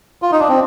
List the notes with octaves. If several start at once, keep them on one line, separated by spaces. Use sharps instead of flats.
F4
D#4
D4
C4